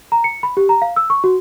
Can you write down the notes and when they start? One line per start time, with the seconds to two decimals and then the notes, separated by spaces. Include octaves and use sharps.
0.12 A#5
0.24 C#7
0.43 B5
0.57 G4
0.69 A#5
0.82 F5
0.96 E6
1.10 C#6
1.24 F#4